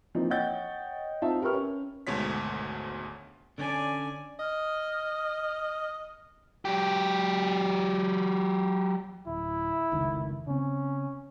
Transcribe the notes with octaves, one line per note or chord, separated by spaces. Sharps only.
E3 F3 A#3 C4 D#4
C#5 D#5 F#5 G5 G6 A6
C4 D#4 F4 E5 A5
G4 A#4 B4 C#6 F6
C#4
G#1 D2 G#2 B2 C#5 B6
D3 C#4 D4 D5 G#5
D#5 F6
F#3 G4
D1 E4
F1 C#2 D#3
C#3 C4 C#4